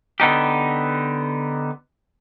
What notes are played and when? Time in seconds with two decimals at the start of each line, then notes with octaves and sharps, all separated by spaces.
0.20 D3 B3 D#4 G4